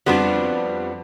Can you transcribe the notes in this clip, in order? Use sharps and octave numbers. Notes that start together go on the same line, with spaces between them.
F2 F3 G3 B3 D4 F#4